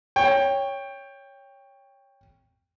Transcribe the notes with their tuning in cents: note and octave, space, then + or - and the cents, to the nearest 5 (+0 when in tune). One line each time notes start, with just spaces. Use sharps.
C#5 +0 G5 +15